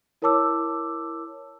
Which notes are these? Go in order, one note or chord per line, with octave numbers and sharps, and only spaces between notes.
E4 A#4 C#5 A5 D6 E6